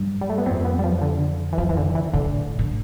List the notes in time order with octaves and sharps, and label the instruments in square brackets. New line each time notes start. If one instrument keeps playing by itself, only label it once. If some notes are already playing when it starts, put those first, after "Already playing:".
Already playing: [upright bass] G2
[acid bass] G3
A3
B3
[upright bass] F2 [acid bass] C4
[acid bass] B3
G3
F3
D3
E3
[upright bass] F2 [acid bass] F3
[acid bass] E3
D3
E3
[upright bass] A2 [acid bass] D3
[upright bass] A2